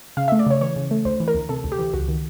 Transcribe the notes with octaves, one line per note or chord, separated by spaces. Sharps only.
C#3 F5
A3 E5
D5
C#3 C#5
E3 C#5
C#3
A3
D2 C5
E3
A#4
D2
C3 A4
D2
G4
E3
C#2 F#4
D#3